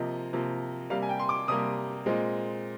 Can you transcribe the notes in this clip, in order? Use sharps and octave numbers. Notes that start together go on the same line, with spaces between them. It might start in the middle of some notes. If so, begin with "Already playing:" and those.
Already playing: C3 F3 A#3 D#5
C3 F3 A#3
C3 G3 A#3 F5
G#5
G5
C6
D6
C3 G3 A#3 D#6
A#2 G#3 C4